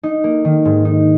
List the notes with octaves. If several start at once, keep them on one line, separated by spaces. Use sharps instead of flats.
D#4
A#3
D#3
G#2
D#4